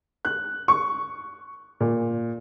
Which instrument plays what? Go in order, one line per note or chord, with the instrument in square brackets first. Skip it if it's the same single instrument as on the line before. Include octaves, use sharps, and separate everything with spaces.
[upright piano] F#6
C#6
A#2